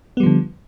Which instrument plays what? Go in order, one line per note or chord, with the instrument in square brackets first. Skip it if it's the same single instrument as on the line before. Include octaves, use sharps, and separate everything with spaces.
[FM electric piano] B3
G3
F3
D3